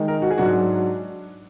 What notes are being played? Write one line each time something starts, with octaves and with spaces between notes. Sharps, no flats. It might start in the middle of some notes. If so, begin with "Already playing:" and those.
Already playing: D#3 G#3 D#4
A#4
F#4
G#4
G#2 F#3 D4 F#4